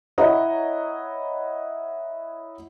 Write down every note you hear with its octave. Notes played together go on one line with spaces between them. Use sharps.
E4 C#5 D#5 F#5 A#5